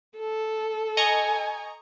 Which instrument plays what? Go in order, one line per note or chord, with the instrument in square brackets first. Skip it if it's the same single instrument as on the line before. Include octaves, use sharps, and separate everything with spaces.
[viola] A4
[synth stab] D#5 A#5 C#6 [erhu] G#5